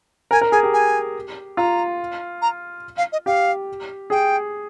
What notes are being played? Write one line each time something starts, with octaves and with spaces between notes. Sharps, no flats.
A#4 G#5
A#4
G#4 G#5
G4
G#5
F4 A#5
A#5
F5
D#5
G4 F5
G#4 G5